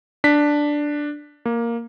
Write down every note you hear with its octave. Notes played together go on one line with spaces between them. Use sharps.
D4 B6
A#3